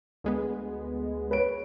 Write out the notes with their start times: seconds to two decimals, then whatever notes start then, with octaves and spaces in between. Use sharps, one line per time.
0.24 D2 G#3 B3
1.31 B4 C#5 D7